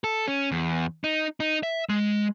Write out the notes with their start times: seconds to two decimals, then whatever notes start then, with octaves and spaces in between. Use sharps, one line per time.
0.04 A4
0.28 C#4
0.52 E2
1.04 D#4
1.40 D#4
1.63 E5
1.89 G#3